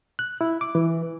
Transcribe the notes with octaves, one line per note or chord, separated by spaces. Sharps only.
F#6
E4
D6
E3